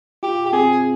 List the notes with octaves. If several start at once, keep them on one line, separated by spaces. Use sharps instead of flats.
F4 G4
G4
C4 G#4